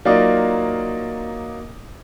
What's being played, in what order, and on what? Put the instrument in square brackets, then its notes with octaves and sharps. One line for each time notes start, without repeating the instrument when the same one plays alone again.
[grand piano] F#3 A#3 D#4 F4 D5 D#5